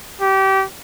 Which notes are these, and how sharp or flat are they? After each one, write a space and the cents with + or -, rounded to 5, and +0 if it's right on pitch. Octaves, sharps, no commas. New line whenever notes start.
G4 -25